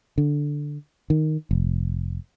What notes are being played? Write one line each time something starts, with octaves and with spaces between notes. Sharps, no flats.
D3
D#3
F1